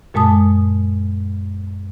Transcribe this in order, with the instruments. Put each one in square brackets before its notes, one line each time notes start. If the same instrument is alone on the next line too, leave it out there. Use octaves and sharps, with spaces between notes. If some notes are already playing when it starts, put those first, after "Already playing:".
[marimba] F#2 A#2 G#3 A5 D#6